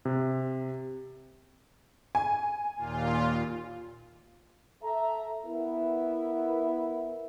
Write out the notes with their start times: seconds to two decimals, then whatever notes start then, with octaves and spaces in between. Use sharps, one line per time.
0.05 C3
2.15 G#5
2.77 D#2 A#2 F4
4.83 A4 E5 A#5
5.46 B3 E4 A#4 E5